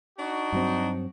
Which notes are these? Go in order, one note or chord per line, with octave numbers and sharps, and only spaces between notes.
D4 D#4 F#4
G2 F#3 C4